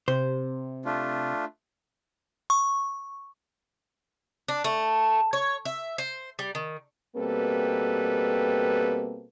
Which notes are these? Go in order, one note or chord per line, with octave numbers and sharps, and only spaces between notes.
C3 C5
A3 D4 F4
C#6
D4
A3
C#5
E5
C5
G3
D#3
B2 G3 A#3 C4 A4 B4